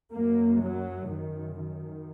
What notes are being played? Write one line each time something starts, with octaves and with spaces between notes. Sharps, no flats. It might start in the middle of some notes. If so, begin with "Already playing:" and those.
F#2 A#3
F#3
F#2 D#3
D#3